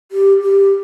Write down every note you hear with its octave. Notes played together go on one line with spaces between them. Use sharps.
G4
G4